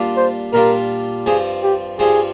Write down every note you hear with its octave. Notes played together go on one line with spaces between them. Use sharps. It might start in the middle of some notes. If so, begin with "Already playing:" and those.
Already playing: A#2 G3 D4 F4
C5
A#2 G3 D4 F4 A#4
G2 F3 C4 G#4
G4
G2 F3 C4 G#4